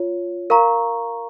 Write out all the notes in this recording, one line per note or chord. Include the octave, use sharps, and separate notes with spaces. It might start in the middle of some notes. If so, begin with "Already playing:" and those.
Already playing: F4 C#5
A#4 F5 A#5 C#6